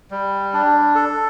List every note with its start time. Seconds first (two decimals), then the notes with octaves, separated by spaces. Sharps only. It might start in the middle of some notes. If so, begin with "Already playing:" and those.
0.11 G3
0.53 D4
0.95 A4